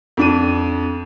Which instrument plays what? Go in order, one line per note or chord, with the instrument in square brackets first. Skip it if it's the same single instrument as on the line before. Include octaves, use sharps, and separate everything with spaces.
[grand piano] F2 D4 D#7